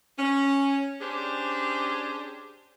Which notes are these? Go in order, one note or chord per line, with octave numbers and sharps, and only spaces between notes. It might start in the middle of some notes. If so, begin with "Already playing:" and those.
C#4
C#4 D4 G4 G#4 C5